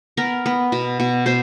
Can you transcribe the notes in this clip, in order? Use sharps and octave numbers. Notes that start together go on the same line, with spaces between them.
B3 A#4
B3
B2
B2
B2 C5